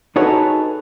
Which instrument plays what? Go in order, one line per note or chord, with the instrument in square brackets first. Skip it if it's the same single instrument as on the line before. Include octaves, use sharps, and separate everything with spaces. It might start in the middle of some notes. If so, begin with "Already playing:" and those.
[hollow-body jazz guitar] D#4 F#4 G#4 A4 B4 C#5